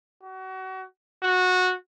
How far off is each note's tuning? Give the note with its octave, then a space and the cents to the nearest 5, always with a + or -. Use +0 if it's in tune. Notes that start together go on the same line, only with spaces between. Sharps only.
F#4 +30
F#4 -15